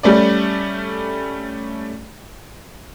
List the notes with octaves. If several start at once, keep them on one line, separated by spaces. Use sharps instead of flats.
G3 A3 C#4 D5